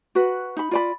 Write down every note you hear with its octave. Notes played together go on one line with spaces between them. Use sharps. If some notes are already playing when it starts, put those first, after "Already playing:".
F#4 B4
D#4 B5
F4 D5 B5